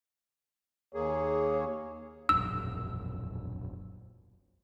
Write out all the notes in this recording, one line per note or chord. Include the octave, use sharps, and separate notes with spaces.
D#2 A#3 G#4 C#5
E1 A#1 F#2 E6